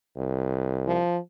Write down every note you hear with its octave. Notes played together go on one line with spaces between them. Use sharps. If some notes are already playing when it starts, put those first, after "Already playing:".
C2
F3